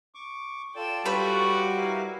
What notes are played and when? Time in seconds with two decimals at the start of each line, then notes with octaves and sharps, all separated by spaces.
0.15 C#6 D6
0.76 F4 A4 D5 G5 E7
1.05 G3 F#4 B4 C#5 B5 D6
1.77 E4 A#4 F5